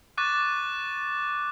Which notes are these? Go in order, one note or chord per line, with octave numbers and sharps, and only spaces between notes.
C#6 D6 F#6 A6